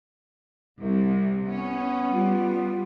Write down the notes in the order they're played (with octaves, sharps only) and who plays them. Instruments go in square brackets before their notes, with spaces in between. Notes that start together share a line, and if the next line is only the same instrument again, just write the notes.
[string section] C2 C3
[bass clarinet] B3 [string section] C#4
[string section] G3 [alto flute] F4